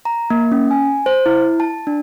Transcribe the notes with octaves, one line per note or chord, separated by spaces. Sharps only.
A#5
A#3
C#4
G#5
C5
E4
A5
D4